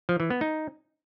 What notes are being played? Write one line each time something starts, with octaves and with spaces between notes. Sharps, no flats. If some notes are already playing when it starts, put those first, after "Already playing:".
F3
E3
B3
D#4